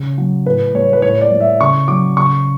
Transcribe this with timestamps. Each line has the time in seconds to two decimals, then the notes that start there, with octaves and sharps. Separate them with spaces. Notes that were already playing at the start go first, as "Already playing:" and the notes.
Already playing: C#3
0.18 F#3
0.46 A2 B4
0.74 G3 C#5
0.93 B4
1.02 A2 C#5
1.21 D5
1.32 G3
1.41 E5
1.60 C#3 C#6
1.88 F#3 D6
2.17 C#3 C#6